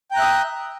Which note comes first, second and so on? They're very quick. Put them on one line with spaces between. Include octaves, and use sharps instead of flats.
G5 A#5 F#6 E5 D#6